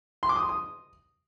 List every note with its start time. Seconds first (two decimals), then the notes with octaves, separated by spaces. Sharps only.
0.23 C6
0.29 D6
0.36 D#6
0.43 C6
0.49 D#6